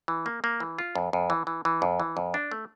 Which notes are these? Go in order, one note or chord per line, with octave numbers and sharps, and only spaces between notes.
E3
A#3
A#3
E3
F4
F2
F2
E3
E3
E3
F2
E3
F2
D4
A3